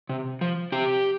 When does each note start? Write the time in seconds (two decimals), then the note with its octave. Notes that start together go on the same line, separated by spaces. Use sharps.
0.09 C3
0.41 F3
0.72 C3 G4